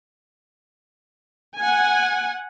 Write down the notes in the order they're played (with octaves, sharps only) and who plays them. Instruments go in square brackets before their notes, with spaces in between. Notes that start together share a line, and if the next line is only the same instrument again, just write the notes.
[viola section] F#5 G#5